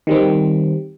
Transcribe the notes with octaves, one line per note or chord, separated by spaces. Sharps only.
D#3 G3 C4